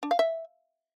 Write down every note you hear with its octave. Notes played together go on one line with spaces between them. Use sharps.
D4
F5
E5